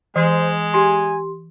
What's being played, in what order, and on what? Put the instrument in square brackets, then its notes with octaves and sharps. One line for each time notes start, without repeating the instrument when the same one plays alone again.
[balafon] E3 [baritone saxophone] G#3 [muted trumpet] C5
[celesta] G4 C6 [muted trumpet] G#5